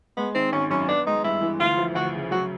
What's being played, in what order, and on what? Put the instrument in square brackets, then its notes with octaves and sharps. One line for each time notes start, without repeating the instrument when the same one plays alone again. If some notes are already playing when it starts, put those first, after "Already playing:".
[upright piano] G#3 [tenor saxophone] B3
[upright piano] D#3 [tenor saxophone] C4
[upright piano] G#1 [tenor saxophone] C#4
[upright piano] F#2 [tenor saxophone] C#4
[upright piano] B3 [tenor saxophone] D4
[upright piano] G#3 [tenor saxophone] D#4
[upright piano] G2 [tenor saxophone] E4
[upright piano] E3
[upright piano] D2 [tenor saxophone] F4
[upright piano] F3
[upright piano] D2 [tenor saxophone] F#4
[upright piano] C#3
[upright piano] F#3 [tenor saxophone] F#4